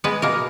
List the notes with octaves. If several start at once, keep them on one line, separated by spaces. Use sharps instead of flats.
G#3 B3 B4
B2 A#3 A#4